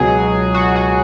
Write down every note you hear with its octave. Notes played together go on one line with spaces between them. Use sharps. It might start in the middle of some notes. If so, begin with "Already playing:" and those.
Already playing: C#2 B2 F#3 G#4
F#4
F#4